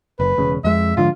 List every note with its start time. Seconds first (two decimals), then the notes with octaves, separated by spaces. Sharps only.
0.20 F#1 B4
0.38 E1 C#3
0.64 F2 G#3 E5
0.97 G#2 D3 F3 F4